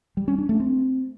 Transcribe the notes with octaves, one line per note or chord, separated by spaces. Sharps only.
G3
C#4
D4
A3
C4